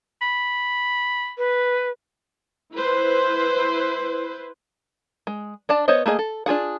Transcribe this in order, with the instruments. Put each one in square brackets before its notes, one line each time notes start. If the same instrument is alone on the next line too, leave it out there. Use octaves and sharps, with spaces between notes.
[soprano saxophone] B5
[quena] B4
[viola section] E4 B4 C5
[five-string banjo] G#3
D4 D5 A5
B3 C5 C#5 D#5
A3 A#3 G#4 D#5
A4
D4 F4 G#4 F#5